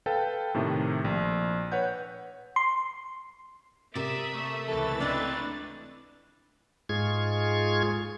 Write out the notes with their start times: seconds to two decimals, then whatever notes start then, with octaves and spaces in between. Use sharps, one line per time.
0.06 A4 B4 F5 G5 A5
0.54 A2 C3 D#3 A3
1.05 A#1
1.72 B4 C#5 F#5 G6
2.56 C6
3.95 C3 A#4 D5 E5 D#6
4.34 A3
4.68 C#2 E3 A4 A6
5.00 A3 C4 D4 B4 D#5
6.89 G#2 G#3 F4 G#4 C#6 G#6